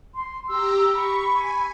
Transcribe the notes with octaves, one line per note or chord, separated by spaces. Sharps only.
C6
G4 A#5 E6
B5 C#6
G#5